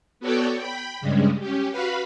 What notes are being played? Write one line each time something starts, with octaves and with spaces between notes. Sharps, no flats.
B3 F#4 A4 C#5 D5 G5
G5 B5
G2 C#3 G3 G#3
C#4 G4
F#4 B4 F5 B5